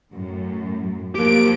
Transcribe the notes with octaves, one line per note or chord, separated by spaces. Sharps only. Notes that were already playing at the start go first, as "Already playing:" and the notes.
F#2 A2
F3 A#3 G4 F5 D7